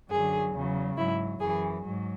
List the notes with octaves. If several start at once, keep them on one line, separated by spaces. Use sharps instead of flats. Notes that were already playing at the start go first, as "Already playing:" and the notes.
F#2 D3 F#3 G#4
E2 C#3 F#3
G#2 F#3 E4
F#2 E3 G#4
G#2 F#3